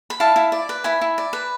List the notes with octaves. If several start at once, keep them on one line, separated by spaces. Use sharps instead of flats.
B5
E4 F5 A5
E4
D5
B4
E4 G#5 B5
E4
D5
B4